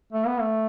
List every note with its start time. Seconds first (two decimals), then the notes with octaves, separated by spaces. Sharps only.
0.13 A3
0.26 B3
0.40 A3